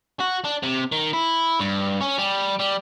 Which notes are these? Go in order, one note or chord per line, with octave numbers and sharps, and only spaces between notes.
F#4
D4
C3
D#3
E4
G2
C#4
G3
G3